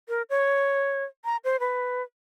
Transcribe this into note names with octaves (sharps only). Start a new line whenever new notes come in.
A#4
C#5
A#5
C5
B4